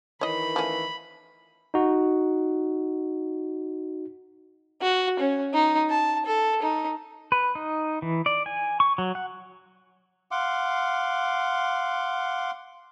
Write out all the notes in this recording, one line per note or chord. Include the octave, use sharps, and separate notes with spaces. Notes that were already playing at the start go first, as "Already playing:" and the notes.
D#3 E3 C#5 D#5 B5
F3 A3 C#4
D#4 F#4
F#4
C#4
D#4
A5
A4
D#4
B4
D#4
E3
D5
G#5
C#6
F#3
F#5
F5 F#5 C6 D6